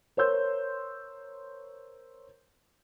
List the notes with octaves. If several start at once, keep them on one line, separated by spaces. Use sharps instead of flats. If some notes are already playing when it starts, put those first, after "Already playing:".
A#4 C5 C#5 C6 E6 G6